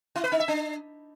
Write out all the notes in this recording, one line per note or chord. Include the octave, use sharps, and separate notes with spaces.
E4
B4
D#4
E5
D4